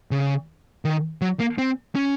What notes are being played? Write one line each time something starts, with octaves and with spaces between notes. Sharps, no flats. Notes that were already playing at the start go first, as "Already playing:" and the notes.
C#3
D#3
F#3
A#3
C4
C#4